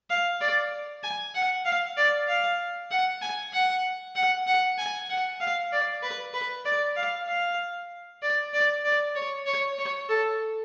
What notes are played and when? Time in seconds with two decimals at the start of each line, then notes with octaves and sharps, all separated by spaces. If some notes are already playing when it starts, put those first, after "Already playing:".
0.10 F5
0.41 D5
1.04 G#5
1.34 F#5
1.65 F5
1.97 D5
2.28 F5
2.91 F#5
3.22 G#5
3.53 F#5
4.15 F#5
4.47 F#5
4.78 G#5
5.09 F#5
5.40 F5
5.72 D5
6.03 B4
6.34 B4
6.65 D5
6.96 F5
7.28 F5
8.22 D5
8.53 D5
8.84 D5
9.15 C#5
9.46 C#5
9.78 C#5
10.09 A4